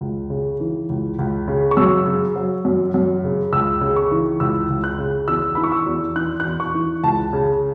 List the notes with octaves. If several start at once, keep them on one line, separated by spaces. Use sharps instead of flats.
C#2
C#3
E3
C#2
C#2
C#3
C#6
F#2 E6
C#3
F#3
F#2
F#2
C#3
C#2 E6
C#3
C#6
E3
C#2 E6
C#2
F#6
C#3
E2 E6
E3 B5
C#6
E6
E2
E3 F#6
F#6
E2
C#6
E3
C#2 A5
C#3